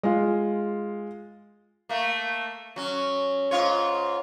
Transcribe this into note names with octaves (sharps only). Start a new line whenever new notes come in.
G#3 F4
A3 A#3
F#3 C#4
G#2 F4 C#5